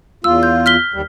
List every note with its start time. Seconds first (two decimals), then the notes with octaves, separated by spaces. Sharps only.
0.24 E2 F4 E6
0.43 G6
0.66 F6 B6 G7
0.94 D#2 G3